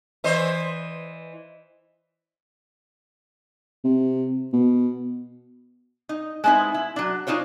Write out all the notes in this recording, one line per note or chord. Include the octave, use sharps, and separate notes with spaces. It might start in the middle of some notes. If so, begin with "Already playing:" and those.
E3 C5 D#5
C3
B2
D#4
G#3 B3 C4 D#4 E4
E4
F#3 D4
D4 D#4 F4 C5 C#5